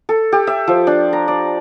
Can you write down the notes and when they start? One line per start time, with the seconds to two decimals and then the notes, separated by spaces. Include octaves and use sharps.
0.09 A4
0.32 G4
0.47 E5
0.68 F3
0.87 D4
1.13 A#5
1.28 D5